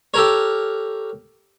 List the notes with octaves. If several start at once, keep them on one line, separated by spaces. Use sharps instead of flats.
G4 A4 A#4 C#5